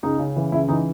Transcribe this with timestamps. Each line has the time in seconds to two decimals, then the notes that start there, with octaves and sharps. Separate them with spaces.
0.03 C#2 D#4
0.19 C#3
0.36 E3
0.52 C#2 E4
0.68 E3 D#4